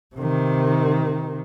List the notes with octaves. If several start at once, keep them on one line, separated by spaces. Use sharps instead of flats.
C3 D#3